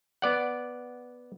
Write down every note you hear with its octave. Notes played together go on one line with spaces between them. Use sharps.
B3 D5 F#5